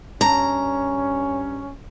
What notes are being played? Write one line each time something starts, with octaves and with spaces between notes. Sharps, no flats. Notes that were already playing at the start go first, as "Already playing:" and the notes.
G2 C#4 A#5